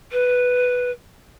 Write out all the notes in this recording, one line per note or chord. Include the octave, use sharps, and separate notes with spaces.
B4